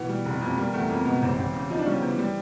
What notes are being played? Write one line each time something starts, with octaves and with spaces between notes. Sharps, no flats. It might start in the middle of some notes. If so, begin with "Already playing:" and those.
Already playing: B2 E3 B3
G3
F1
F2
G3 A#3
E2 A3
F2 A#3
B2 G#3 B3
A1 C3 C4
A1
C#3
F3 D#4
D4
C#3 G3 C#4
B3
C3 E3 C4
G3